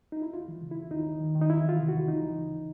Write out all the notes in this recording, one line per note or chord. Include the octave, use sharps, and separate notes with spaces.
D#4
E4
D#2 F4
E3
C#3
E4
D#2
D#2 D#4
D#2
D#3
D#3
D#4
E2 E4
E3 F4
C3
F#4
E2
D2 D#4
E3
C#3